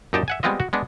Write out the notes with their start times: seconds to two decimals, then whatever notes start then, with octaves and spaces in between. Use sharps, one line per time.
0.13 F#2 A#2 D#4 G4 G5 A5
0.28 E5 F#5 G#5
0.43 G3 G#3 B3 C4 F4 D#5
0.60 F#4
0.73 G#3 B3 D4